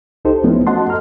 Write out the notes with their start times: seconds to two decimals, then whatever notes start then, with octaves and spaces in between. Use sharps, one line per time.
0.25 C2 D#4 G4 A4 C5
0.44 F3 A3 B3 C#4 E4
0.67 F#4 D#5 F#5 A5 C6
0.87 F#2 A4 D#5 A#5 F6